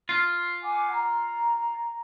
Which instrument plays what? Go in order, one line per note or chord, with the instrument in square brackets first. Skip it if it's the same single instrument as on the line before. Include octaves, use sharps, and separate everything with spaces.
[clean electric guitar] F4
[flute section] F#5 G#5 D6
A#5